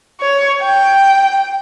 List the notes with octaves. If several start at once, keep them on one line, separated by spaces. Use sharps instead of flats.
C#5
G5